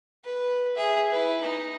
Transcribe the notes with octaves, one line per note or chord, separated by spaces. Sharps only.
B4
G#4 E5
E4 B4
D#4